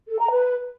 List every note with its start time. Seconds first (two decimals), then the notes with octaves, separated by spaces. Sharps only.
0.08 A4
0.19 A#5
0.31 B4